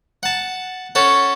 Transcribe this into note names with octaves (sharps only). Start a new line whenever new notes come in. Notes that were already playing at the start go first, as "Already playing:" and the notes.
F#5 A5
C#4 A4 F#5